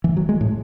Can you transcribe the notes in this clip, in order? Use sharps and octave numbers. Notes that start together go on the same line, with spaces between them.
E3
F#3
G#3
A2